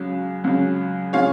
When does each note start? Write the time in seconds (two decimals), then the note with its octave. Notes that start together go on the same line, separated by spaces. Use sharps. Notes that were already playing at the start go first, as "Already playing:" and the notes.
Already playing: C#2 C#3 F#3
0.44 C#2 C#3 F#3
1.13 C#3 F3 G#3 C#5 F5